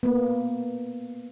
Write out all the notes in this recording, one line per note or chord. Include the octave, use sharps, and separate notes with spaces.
A#3 B3